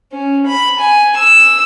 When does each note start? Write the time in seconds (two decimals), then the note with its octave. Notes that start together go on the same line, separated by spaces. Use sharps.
0.12 C#4
0.47 B5
0.80 G#5
1.17 E6